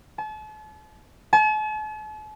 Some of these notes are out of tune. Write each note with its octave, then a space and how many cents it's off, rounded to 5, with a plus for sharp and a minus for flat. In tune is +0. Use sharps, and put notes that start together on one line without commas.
A5 -40
A5 -45